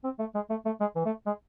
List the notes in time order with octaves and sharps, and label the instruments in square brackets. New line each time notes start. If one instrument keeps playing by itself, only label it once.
[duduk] C4
A3
G#3
A3
A3
G#3
E3
A3
G#3